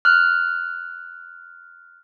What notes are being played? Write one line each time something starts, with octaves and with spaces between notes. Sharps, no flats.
F6 F#6